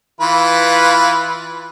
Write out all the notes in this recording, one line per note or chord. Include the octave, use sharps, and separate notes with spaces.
E3 F4 B4